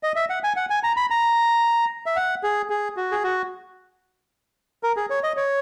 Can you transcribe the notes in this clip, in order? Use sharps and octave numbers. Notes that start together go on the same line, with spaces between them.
D#5
E5
F#5
G#5
F#5
G#5
A#5
B5
A#5
E5
F#5
G#4
G#4
F#4
G#4
F#4
A#4
G#4
C#5
D#5
C#5